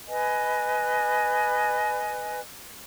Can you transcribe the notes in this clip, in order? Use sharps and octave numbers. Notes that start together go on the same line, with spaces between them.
B4 D#5 G#5